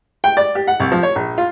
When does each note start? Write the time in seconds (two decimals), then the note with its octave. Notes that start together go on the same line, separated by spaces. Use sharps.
0.24 G5
0.37 D5
0.55 G4
0.67 F#5
0.80 C2
0.92 F3
1.03 C#5
1.15 A#1
1.38 F4